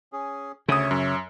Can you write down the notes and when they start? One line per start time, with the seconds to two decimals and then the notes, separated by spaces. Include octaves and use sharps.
0.13 C#4 G#4
0.68 D2 C#3 C#5 E5 D#6
0.91 F#2